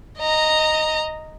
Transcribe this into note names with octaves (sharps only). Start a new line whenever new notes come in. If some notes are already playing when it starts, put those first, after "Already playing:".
D#5 A#5